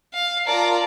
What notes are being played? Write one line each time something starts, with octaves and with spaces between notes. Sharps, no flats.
F5
F4 A#4 D5 A5 A#5